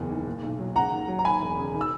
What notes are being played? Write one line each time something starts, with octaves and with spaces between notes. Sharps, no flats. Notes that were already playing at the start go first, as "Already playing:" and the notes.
Already playing: F#1 E2 E3
D#3
A#2
B1
F#3
C#3 F#5 A#5
D#2
F#3
A#5
D#2 G#5 B5
E1
C#3
D#3
E6